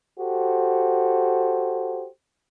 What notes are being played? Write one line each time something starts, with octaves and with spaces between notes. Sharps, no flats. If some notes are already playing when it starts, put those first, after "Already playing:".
F#4 G4 A4 C5